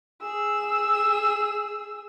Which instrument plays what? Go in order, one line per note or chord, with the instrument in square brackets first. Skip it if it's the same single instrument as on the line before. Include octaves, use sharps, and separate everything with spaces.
[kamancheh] G#4 E6